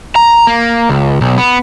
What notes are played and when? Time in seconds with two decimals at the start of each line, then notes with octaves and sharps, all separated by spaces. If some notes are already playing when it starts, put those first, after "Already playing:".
0.16 A#5
0.47 A#3
0.89 C#2
1.21 B1
1.38 B3